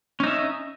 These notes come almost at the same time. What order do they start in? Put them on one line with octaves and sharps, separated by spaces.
C#4 D#4 E5